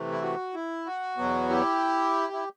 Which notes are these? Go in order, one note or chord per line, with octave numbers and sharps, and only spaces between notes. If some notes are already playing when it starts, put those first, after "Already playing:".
Already playing: C3 E3 A3
E4
F#4
E4
F#4
E2 B2 F#3 B3
E4 G4
E4